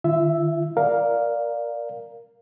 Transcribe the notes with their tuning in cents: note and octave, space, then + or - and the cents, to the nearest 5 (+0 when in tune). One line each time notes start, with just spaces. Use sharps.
D#3 -30 F4 -40 E5 +0
A#4 +0 D5 +0 F5 +0